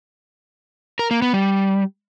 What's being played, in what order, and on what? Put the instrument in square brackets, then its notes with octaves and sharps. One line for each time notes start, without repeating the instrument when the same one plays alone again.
[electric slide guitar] A#4
A#3
B3
G3